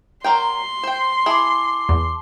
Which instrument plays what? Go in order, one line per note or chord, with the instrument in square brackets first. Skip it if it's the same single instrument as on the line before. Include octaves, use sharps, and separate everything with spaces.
[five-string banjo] F#3 A#4 G5 [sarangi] C6
[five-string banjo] C5 G5
[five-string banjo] E4 G#4 [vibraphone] A5 D6
[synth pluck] E2